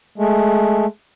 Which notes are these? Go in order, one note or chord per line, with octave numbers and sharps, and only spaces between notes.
G#3 A3